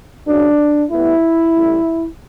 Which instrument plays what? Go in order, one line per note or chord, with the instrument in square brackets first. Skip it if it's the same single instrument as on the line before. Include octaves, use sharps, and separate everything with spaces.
[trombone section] F#2 C#3 F#3 D4
A2 G3 B3 E4
A1 A2 G3